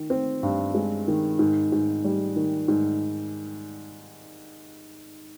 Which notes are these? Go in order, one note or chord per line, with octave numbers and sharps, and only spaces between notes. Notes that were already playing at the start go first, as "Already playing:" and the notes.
Already playing: D#3
C4
G2
G#3
D#3
G#2
G#2
G3
D#3
G#2